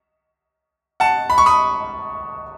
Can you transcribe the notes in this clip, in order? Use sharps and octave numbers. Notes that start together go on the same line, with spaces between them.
F#5 A5
B5
C#6
B5 D#6